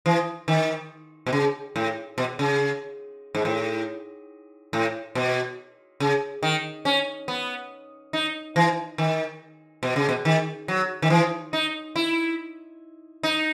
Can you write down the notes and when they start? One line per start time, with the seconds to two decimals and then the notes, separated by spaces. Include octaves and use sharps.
0.06 E3
0.48 D#3
1.26 B2
1.33 C#3
1.76 A2
2.18 B2
2.39 C#3
3.35 G#2
3.45 A2
4.73 A2
5.15 B2
6.00 C#3
6.43 D#3
6.85 C#4
7.28 B3
8.13 D#4
8.56 E3
8.98 D#3
9.83 B2
9.96 C#3
10.09 B2
10.25 D#3
10.68 F#3
11.02 D#3
11.10 E3
11.53 D#4
11.96 E4
13.23 D#4